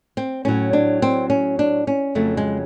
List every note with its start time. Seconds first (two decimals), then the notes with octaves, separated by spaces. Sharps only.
0.17 C4
0.45 A2 F#3 C#4
0.73 D4
1.02 C4
1.30 C#4
1.59 D4
1.87 C#4
2.15 F2 C#3 F#3 A3
2.37 G#3